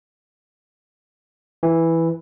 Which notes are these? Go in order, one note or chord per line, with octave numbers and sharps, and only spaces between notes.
E3